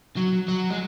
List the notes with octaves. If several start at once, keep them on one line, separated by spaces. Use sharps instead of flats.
F#3
F#3
G#3